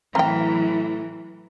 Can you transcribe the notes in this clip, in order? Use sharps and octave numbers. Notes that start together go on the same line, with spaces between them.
A2 E3 F#3 C4 G5 A#5 F6 A#6